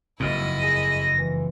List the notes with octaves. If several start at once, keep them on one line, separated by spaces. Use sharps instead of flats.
F#1 F2 G#2 E4 D#5
G#4 A#6
E3